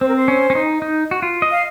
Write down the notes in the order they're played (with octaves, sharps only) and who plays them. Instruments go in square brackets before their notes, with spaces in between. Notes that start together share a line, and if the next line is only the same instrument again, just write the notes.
[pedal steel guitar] C4 [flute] C5
[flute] A#4
C5
[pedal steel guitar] C#4
C#4
D#4
D#4
F#4
F4
D#5
[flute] F5